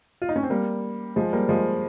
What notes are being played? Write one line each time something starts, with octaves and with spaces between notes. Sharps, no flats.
F4
D#4
C#4
C4
G3 A#3
F3 G#3
G3 A#3
F3 G#3